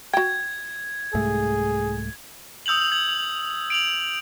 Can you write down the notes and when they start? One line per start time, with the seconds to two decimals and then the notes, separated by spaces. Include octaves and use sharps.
0.13 F#4 G5 G#6
1.14 C2 G#2 A3 G#4
2.66 D#6 E6 G6 F7 F#7
2.92 G#6 F#7
3.70 D7 F7 F#7